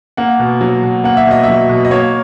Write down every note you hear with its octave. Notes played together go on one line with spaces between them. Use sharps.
A#3 F#5
B2
F#3
B2
A#3 F#5
E5
B2 D#5
F#3 E5
B2
D#5
A#3 C#5